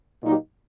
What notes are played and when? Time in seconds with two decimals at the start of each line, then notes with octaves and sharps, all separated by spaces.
0.21 A#2 F#3 A#3 D#4 G4